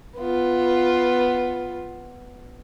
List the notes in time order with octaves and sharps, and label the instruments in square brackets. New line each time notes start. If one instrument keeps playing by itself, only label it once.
[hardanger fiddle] B3 F4